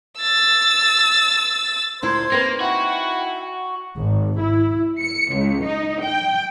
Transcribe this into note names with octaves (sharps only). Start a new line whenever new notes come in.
E6 A6
D2 A#2 E4 C5 C6 G#6
A#3 C4 D#4 B4
E4 F#4 F#5 G5
G#1
E4
C#7
C#2
D#4
G5